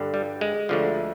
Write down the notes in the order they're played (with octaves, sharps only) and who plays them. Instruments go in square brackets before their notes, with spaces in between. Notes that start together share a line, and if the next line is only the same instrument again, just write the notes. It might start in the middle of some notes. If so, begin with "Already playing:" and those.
Already playing: [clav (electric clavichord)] G2 D3
G3
G#3
D2 D3 F3